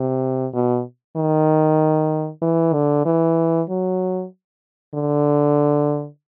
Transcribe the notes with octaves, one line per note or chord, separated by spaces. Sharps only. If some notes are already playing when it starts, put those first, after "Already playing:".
Already playing: C3
B2
D#3
E3
D3
E3
F#3
D3